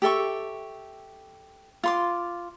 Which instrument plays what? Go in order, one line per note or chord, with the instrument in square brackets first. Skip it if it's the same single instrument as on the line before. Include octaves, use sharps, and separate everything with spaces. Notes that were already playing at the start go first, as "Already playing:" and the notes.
[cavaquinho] G4 A4 E5 C#6
F4 C6 D6